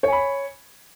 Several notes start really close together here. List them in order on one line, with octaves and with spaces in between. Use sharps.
C#5 G#5 B5